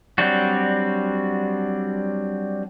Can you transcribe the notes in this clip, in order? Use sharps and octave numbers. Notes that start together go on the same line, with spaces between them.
F#3 G3 C4 D4 F#4